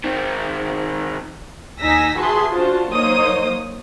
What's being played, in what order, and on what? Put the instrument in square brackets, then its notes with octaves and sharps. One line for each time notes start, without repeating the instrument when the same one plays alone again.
[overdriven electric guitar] D#3 C4
[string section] D#2 D#4 G#5 E6 A#6 B6
F#4 G#4 B4 E5 A5 C6
D4 F4 F#4 C5 A5
F#3 A#3 D#4 C5 C#5 D#6